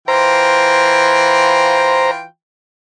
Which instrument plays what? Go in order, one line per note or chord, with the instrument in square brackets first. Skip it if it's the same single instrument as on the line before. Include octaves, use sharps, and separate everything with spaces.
[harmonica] E3 F4 G5 [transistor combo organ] C5 A#5